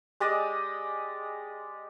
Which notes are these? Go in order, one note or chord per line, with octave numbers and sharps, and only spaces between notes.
G#3 G4 D5 D#5